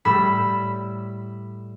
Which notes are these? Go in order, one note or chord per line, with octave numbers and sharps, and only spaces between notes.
A2 G3 B5 E6 B6